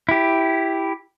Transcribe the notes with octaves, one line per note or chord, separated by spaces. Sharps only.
E4 G4